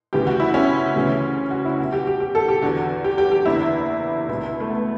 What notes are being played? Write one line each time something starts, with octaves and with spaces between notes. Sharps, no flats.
D2 C#3 E3 G4
F#4
E4
C#4
D2 C#3 E3
F#4
E4
B1 B2 F#4
G4
G4
G4
A4
G4
E2 D3 F#4
G4
G4
G4
F#1 E2 D3 E4
C#2 B2 E4
A3
B3